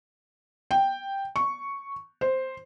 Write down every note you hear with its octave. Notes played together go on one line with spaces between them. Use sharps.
G5
C#6
C5